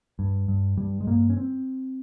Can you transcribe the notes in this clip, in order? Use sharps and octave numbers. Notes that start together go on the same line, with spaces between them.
G2
G2
G2 G3
G#3
G2 A#3
C#4
C4